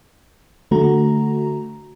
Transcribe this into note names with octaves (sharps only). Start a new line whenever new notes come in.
D3 A3 F#4 A#5